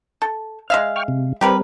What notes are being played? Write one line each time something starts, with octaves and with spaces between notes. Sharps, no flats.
A4
G#3 E5 F5
G5 C#6 F6
C3
G3 C4 G4 A#4 B4